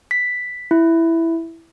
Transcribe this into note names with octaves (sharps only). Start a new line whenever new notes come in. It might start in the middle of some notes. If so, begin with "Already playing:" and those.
B6
E4